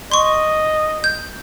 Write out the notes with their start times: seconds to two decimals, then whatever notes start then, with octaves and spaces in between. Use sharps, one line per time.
0.11 D#5 C6 C#6
1.04 G6